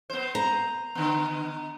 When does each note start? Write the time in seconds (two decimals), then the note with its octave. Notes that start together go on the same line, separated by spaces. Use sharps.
0.10 B3 C5
0.35 A#5
0.95 D3 B3